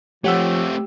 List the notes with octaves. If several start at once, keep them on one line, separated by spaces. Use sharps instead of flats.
F3 A3 C4 G4 C#5 F#5 E6